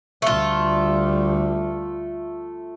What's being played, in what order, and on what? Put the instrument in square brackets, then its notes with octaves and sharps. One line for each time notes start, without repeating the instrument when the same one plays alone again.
[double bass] D2 G3 [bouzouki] A3 F4